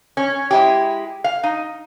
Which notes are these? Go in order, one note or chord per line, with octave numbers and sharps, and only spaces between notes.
C#4
G#3 E4 G4
F5
D#4